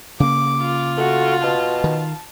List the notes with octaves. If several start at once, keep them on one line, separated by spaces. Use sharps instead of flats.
C#3 A#3 D6
F4
A3 F#4
B2 A5
D#3